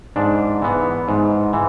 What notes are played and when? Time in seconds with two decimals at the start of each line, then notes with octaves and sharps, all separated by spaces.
0.16 G#2 D4
0.62 E3 B3
1.08 G#2
1.53 E3